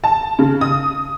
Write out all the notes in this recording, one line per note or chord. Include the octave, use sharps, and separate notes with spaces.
A5
C#3
D#6